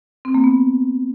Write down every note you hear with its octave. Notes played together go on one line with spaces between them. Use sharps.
C4
A#3
B3